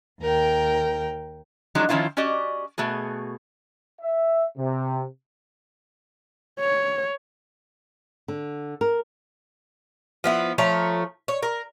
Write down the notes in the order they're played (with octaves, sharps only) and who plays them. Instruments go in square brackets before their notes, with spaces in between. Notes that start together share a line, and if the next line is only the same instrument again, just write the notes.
[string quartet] D#2 A#4 G5
[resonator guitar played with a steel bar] F3 F#3 G#3 D4 D#4
D#3 F3 C#4 E4 F4
C#4 F#4 G4 D5 D#5
B2 A3 F#4 G#4
[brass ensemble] E5
C3
[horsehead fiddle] C#5
[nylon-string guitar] D3
A#4
[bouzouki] F3 B3 E4
F3 A3 C#5 A#5
C#5
A#4